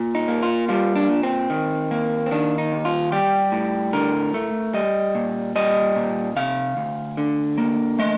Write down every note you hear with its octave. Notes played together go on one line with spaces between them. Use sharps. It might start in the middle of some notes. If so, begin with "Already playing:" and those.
Already playing: A#2
D#4
A#3
F4
G3 F4
D4
A#2
C4
D#3
A#3
C4
D#3 D4
D#4
D#2
F4
G3 G4
A2
D3 A#4
A3
G3 D#5
A#2
G3 D#5
A#2
C3 F5
D2
D3
A#3
A3 D#5